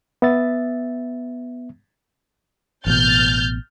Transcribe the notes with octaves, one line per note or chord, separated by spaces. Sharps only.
B3 E5 A6
A1 B2 F6 G6 A6